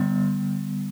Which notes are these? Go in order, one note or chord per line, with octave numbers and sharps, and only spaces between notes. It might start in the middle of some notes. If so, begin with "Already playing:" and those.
Already playing: D3 G3 B3